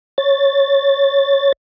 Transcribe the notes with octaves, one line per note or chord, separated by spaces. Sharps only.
C#5 A6